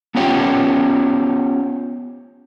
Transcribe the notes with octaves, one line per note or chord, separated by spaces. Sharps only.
B3 C#4 F4 G4 C#5 G5